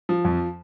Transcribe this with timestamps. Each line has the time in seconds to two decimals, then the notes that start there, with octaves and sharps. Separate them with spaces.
0.09 F3
0.25 F2